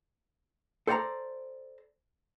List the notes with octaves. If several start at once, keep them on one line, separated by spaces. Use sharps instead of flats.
A4 C5 D5 F#5 A#5